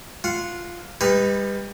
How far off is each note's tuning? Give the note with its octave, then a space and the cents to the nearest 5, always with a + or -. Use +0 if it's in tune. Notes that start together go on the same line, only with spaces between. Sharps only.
F4 -5 F#5 -15
G3 +30 D#4 +0 B4 +0